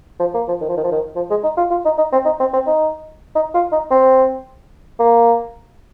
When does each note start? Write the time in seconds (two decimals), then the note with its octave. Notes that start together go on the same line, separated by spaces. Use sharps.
0.20 F3
0.34 A#3
0.48 F3
0.61 D#3
0.69 F3
0.77 D#3
0.84 F3
0.91 D#3
1.16 F3
1.30 G#3
1.44 D#4
1.57 F4
1.71 F4
1.85 D#4
1.98 D#4
2.12 C4
2.25 D#4
2.40 C4
2.54 C4
2.67 D#4
3.35 D#4
3.54 F4
3.72 D#4
3.91 C4
5.00 A#3